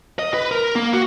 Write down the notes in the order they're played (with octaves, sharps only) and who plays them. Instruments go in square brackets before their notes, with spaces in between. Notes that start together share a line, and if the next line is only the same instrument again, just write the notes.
[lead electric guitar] D#5
B4
A#4
A#3
F#4